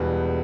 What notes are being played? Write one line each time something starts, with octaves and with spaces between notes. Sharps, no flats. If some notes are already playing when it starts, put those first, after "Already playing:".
Already playing: E1 E2 B2 G3 B4